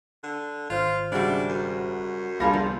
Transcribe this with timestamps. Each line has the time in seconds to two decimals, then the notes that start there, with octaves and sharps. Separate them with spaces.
0.24 D3
0.70 G#1 F4 C5 F6
1.12 C#3 G3 G#3 D4 F#4 E5
1.49 F#2
2.40 C2 G3 A#3 D4 F4 G#4 A4 A#6
2.53 E2 F3